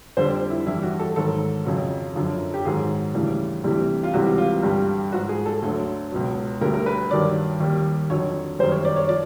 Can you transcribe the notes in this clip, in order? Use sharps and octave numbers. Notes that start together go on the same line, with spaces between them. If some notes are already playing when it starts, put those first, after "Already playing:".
F2 D3 G3 C5
E4
G2 E3 G3 E4
F#4
A4
G#2 D#3 F#3 A4
F2 C#3 F#3
F#2 D3 F3
G4
G#2 D#3 F#3 G#4
D2 C#3 E3 G3
D2 C3 E3 G3
F4
C#2 C3 E3 G3 F#4
F4
G2 D3 G3
G#2 F3 F#4
G#4
A4
D2 D3 F#3
C#2 B2 F#3
D2 D3 G3 A#4
A#4
B4
G2 D#3 F#3 D5
D#2 D#3 G3
F2 D3 F#3 C#5
F#2 D#3 G3 C5
C#5
D5
C#5
F3 D5